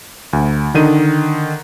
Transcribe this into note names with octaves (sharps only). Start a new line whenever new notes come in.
D2
D3 D#3 D#7